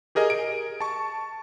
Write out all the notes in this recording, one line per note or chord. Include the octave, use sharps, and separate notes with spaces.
G4 G#4 A#4 D#5 G#5
D7
A5 C#6